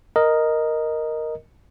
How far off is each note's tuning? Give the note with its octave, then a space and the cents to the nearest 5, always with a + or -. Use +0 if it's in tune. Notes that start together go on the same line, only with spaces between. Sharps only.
A#4 +0 D#5 +0